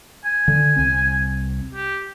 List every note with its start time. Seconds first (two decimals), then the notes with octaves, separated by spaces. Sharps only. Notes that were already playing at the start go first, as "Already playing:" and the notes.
0.25 G#5
0.48 D3
0.76 C2 C4
1.73 G4